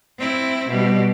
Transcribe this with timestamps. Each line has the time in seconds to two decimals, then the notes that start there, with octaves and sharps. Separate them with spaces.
0.19 C4 E4
0.69 B2 G3